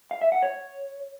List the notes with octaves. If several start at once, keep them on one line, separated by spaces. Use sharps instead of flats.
F5
E5
F#5
C#5